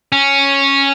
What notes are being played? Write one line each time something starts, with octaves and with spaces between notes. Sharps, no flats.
C#4